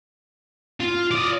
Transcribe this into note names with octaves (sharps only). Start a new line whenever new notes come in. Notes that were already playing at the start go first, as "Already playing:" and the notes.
F4
D5 D#5